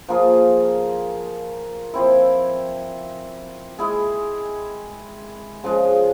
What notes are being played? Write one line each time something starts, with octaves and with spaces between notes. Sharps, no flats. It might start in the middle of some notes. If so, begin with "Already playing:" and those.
F3 A#3 F4 G#4
F3 C4 E4
G#3 E4 G#4
C#3 F3 G#3